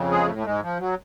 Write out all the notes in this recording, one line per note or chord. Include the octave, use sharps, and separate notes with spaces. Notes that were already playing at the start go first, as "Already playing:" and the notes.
Already playing: F2 C#3
G#3 G#4
A2 A3
A3
G#2 G#3
F3
F#3